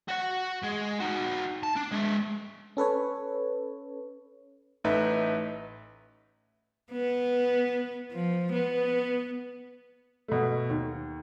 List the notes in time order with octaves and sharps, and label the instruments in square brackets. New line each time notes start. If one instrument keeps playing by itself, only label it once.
[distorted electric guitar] F#4 F#5
G#3
D#4 F#4
A5
D4
G#3 E5
[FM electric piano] C#4 A4 B4 C#5
[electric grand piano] A1 A3 D#4 B4 E5
[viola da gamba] B3
F3
B3
[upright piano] B2 A3
D#2